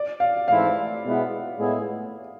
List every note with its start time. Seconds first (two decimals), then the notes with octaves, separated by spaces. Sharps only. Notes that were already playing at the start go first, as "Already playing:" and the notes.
Already playing: D5
0.20 F5
0.48 G#2 E3 A3 C4 E4 F5
1.03 B2 G#3 B3 E4
1.58 A2 G#3 B3 E4 G#4